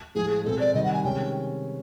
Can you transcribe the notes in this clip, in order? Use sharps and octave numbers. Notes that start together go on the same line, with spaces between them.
A2 F3 G#3 G#4
G#4
B2 G#3 C4 A4
D5
C3 D#3 G3 D#5
F#5
G#5
C3 D#3 G#3 C#4 G5